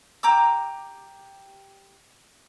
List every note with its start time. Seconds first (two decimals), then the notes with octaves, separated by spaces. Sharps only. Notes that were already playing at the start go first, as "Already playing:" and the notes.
0.23 G4 A#5 D6 E6